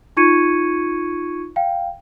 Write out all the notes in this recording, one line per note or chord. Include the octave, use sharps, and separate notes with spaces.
D#4 F4 C#6 G#6 C#7 D#7
F5 G5